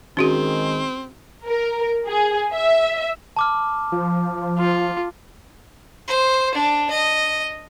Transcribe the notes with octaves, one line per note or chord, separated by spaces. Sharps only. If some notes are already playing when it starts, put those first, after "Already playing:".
D#3 G#3 C4 C#4 F#4 G#4
A#4
G#4
E5
A5 D6 F6
F3
F4
C5
D4
D#5